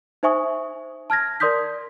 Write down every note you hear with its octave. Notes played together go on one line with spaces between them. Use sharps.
D#4 C5 E5 G#5 C#6 D#6
A5 F6 G#6 A#6
A#4 D5 C6 D#6 G6 B6